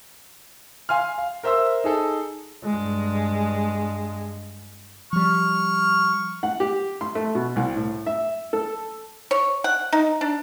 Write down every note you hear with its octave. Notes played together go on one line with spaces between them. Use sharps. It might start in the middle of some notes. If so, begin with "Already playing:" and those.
F5 G#5 C6 F6
F5
A#4 C5 E5 C6 E6
D#4 G#4 A4
G2 G#3
F3 G3 C#6 F6
F#5
G4
C6
A3
B2
C2
A2
E5
A4
C#5
F#5
D#4
D4